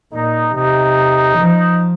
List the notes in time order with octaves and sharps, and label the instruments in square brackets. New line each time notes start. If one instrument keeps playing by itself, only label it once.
[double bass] A#2 [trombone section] D#4
[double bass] C3 [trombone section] D#4
[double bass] F3